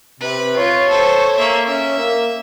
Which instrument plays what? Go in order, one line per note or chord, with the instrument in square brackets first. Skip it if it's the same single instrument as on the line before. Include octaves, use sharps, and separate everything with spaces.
[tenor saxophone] C3 [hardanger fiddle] B4
[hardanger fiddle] F4 [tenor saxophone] C#5
[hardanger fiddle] A4 C5
A#3 E5
[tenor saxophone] C#4 [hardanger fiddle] E5
[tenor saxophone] A#3